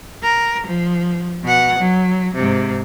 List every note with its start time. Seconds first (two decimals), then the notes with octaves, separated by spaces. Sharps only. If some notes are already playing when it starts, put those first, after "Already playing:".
0.23 A#4
0.67 F3
1.43 B2 F#5
1.79 F#3
2.34 G#2 C3